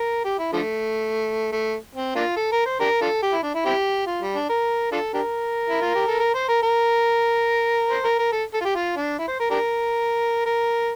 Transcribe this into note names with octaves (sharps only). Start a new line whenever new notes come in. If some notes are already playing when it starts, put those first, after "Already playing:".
Already playing: A#4
G4
E4
D3 F3 A3
A3
C4
A#3 D4 F4
A4
A#4
C5
D4 G4 A#4
D4 F4 A4
G4
E4
D4
E4
C4 E4 G4
F4
G3
D4
A#4
D4 F4 A4
D4 G4 A#4
E4
F4
G4
A4
A#4
C5
A#4
A#4
C5
A#4
A#4
A4
A4
F4
G4
F4
D4
E4
C5
A#4
D4 G4 A#4
A#4